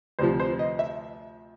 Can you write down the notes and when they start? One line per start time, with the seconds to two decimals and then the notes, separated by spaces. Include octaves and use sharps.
0.19 D2 C3 F3 C5
0.40 C5
0.59 D#5
0.79 E5